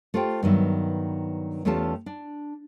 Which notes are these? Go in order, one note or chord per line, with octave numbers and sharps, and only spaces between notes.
A3 F4 G4 C5 G5
G2 D#3 F#3 B3 E5
E2 A3 C#4 F4 G4 A5
D4